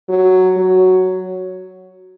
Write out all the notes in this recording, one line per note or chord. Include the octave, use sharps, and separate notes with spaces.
F#3
F#3